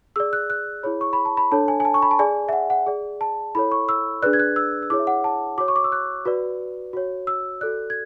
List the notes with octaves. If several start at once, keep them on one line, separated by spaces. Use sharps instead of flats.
G#4 D5 E6
F#6
F#6
E4 G#4 C#5 B5
C#6
B5
A5
B5
D4 A4 C#5 A5
G#5
G#5
A5
C#6
B5
A5
G#4 D5 G#5
E5
F#5
F#5
G#4 D5
A5
E4 A4 C#5 B5
C#6
E6
D4 G#4 B4 D5 F#6
G#6
F#6
E6
E6
E4 G#4 C#5 D6
E5
F#5
A5
F#4 C#5 D6
C#6
D6
E6
F#6
F#4 B4 D5
F#4 C#5
E6
F#4 A4 D5 F#6
G#6